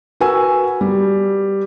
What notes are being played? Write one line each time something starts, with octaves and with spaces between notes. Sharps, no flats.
F#4 A#4 B4 G#5 E6
G3